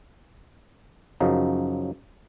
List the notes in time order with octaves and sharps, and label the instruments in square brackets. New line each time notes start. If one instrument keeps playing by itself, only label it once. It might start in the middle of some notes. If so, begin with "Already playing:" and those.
[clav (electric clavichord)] F#2 C#3 F3 F#3 D#4